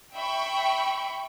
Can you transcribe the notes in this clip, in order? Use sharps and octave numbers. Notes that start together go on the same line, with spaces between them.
E5 G5 B5 C#6